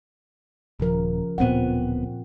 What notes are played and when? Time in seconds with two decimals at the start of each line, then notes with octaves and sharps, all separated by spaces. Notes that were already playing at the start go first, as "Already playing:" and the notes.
0.80 D#1 C#3 F3 A#4
1.38 D1 A#2 B3 C4 F#5